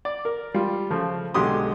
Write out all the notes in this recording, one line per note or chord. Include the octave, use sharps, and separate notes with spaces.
D5
A#4
G3 F4
C#3 F3 A3
B1 D3 G#3 G4 C6 D#6